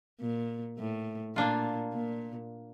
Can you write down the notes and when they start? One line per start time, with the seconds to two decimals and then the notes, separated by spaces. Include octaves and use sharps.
0.21 A#2
0.78 A2
1.36 A#2 A#3 D4 F4
1.93 A#2